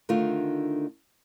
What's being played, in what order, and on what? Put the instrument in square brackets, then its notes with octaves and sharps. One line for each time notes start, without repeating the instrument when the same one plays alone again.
[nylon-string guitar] D3 D#3 A3 D4 F4